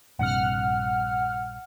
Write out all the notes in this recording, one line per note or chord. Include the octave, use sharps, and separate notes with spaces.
A#1 G2 C3 F#5 F6